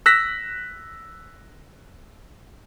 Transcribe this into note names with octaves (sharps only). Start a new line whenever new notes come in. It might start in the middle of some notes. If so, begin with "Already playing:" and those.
E6 F#6 A#6 B6